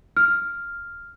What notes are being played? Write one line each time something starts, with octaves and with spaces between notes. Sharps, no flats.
F6